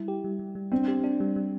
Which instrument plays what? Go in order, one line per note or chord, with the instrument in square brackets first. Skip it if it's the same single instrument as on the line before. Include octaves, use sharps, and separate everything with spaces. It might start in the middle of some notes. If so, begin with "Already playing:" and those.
Already playing: [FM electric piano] G3 E4
G4
G3
G3
G3
[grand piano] C4 [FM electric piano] D4
[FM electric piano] G4
D4
G3
G3